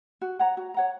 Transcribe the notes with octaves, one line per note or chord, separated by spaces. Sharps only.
F#4
C#5 F#5 A#5
F#4
C#5 F#5 A#5